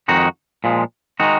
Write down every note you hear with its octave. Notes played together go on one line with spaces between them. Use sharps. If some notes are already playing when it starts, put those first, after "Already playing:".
F2 D#3 G#3 D#4 F#4
A#2 F3 G#3
D#3 G#3 D#4 F#4